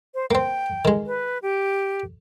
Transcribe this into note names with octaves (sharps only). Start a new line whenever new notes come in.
C5
A#3 C4 G5
D#3 G#3
B4
G4